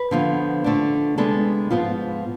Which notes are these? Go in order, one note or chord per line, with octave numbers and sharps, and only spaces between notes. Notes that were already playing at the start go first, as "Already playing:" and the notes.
Already playing: B4
D3 F3 B3
D3 A3 D4
C3 G#3 B3 D4 A4
G#2 F3 B3 F4